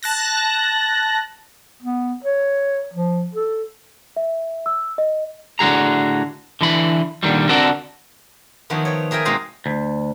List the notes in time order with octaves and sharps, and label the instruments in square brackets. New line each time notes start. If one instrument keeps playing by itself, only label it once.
[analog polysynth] A5 F#6 A#6
[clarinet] B3
C#5
F3
A4
[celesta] E5
E6
D#5
[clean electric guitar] A2 D3 F#4 G#4 A#5
D3 E3 B5
A#2 D3 D#3 F#3 G3
D3 C4 F#4 A4 A#4 D5
[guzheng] D#3 F3 F#3 B3 E4
C#5 G5
G#4 A#4 E5 G5 G#5
B2 G#3 A#3 C4 D#4 A#5
[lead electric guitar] D2